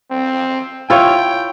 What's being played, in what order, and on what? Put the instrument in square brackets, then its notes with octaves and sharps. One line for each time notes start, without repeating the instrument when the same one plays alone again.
[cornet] C4
[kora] E4 F4 C#5 [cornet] G5